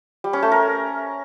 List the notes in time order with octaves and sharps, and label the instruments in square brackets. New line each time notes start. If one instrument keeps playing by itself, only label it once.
[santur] G3
C#4
A3
A#4